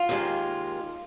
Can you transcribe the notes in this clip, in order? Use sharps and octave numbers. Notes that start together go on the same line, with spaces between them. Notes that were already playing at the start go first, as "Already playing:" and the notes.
Already playing: F4
D#2 D#3 G#3